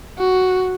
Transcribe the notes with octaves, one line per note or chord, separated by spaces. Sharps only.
F#4